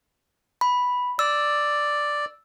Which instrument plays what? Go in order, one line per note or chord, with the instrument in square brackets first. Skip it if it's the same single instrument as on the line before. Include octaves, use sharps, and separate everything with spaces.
[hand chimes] B5
[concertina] D5 [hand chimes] E6